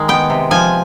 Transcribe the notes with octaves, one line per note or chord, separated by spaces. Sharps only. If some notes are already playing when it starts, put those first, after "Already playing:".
Already playing: D#3 G#3
B3 G5
C3
F3 G#5